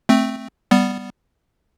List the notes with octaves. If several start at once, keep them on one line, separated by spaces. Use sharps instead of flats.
A3 C4
G3 B3